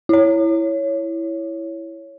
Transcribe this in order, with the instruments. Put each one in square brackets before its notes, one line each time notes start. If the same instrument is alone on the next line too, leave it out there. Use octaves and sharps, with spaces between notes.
[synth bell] E4 C#5